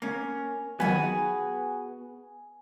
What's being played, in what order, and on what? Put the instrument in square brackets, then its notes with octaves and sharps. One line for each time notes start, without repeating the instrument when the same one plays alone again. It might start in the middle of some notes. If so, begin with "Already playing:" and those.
[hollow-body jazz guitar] A#3 C#4 [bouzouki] A#4
[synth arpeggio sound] D#3 F#3 F4 [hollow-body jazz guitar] B3 [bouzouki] F#4 G#4 B4 [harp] G#5